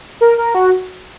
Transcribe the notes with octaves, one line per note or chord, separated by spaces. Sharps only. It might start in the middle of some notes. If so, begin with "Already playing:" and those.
A#4
A#4
F#4